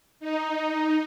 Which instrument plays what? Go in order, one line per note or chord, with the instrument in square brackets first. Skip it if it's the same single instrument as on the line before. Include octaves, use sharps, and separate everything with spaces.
[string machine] D#4